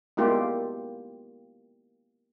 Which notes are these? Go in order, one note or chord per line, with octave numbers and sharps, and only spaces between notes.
G#3 A#3 B3 E4 F4 G4